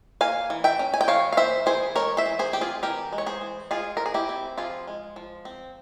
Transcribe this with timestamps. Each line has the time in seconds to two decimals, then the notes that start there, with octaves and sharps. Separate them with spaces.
0.21 A#3 F5 G#5
0.50 E3
0.64 E5 G5
0.79 C#4
0.94 G#5
1.01 G5
1.08 E3 C#5 F5
1.32 F5
1.37 A#3 C5 E5
1.66 E3 G#4 C5
1.96 G#3 A#4 C#5
2.17 C5 E5
2.26 E3
2.39 G#4 C5
2.53 C4 G4
2.61 F4 G#4
2.83 E3 G4 A#4
3.13 G#3
3.18 C#5
3.26 G#4 C5
3.41 E3
3.71 G#3 F4 G#4
3.97 A#4
4.00 F3
4.06 G#4
4.14 E4 G4
4.29 C4
4.58 F3 F4 G#4
4.87 G#3
5.16 F3
5.45 C4